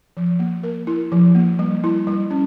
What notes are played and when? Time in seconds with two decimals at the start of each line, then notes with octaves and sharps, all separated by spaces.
0.17 F3
0.39 A#3
0.63 A#4
0.87 E4
1.12 F3
1.35 A#3
1.59 G3
1.84 E4
2.07 G3
2.31 C#4